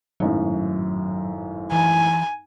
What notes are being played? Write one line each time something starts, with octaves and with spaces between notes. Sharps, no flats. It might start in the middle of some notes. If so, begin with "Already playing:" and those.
G#1 F#2 A2 F#3
E3 G#5